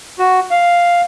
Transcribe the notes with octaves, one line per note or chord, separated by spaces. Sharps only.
F#4
F5